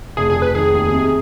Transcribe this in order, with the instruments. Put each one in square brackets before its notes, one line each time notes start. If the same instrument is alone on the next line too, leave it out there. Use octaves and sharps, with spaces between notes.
[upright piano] F1 [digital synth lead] G#4
[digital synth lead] G#4
[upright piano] F1
[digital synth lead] B4
[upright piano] D#3 [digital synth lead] G#4
[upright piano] D#2
C3